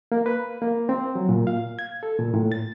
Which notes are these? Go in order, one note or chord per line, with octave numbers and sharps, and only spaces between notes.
A#3
B4
A#3
C4
F#3
A#2
F5
G#6
A4
A#2
A2
A6